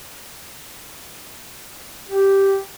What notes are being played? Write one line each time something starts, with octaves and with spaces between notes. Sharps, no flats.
G4